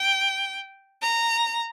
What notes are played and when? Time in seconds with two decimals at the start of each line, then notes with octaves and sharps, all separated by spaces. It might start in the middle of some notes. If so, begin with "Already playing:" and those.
Already playing: G5
1.02 A#5